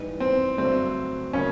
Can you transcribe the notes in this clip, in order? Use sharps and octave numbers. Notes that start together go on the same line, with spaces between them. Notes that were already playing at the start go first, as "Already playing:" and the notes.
Already playing: G#2 E3 G3 B3 D#4
C4
G2 D3 F#3 A3 C4 D4
C#3 F#3 A#3 C#4